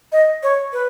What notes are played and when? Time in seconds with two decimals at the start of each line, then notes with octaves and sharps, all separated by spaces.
0.12 D#5
0.43 C#5
0.73 B4